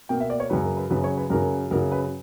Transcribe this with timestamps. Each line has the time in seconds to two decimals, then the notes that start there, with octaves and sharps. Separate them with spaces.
0.09 B2 A#3 G5
0.20 E5
0.30 D5
0.40 C#5
0.50 F#2 C#3 F#3 B4
0.64 A#4
0.77 B4
0.90 F#2 C#3 F#3 B4
1.04 C#5
1.17 B4
1.30 F#2 C#3 F#3 A#4
1.71 F#2 C#3 F#3 A#4
1.92 B4